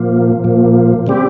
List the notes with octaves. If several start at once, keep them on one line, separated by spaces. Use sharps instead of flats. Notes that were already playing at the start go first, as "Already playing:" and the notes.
Already playing: A#2 F3 A#3
A#2 F3 A#3
C#3 G3 C4 G4